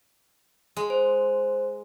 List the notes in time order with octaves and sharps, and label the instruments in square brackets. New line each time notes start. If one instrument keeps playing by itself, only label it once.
[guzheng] G#3
[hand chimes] C5